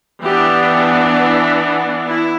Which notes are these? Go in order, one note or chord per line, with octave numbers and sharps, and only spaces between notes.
E3 B3 D4 G4
E4